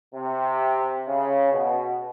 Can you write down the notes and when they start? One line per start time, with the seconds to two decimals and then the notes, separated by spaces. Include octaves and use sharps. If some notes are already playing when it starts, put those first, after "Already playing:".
0.14 C3
1.07 C#3
1.52 B2